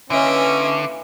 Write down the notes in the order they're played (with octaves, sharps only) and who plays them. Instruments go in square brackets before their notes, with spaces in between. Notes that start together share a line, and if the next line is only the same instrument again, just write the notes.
[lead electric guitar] D3 [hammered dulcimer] E3 A#3 [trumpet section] C#4 [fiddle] D#5 E5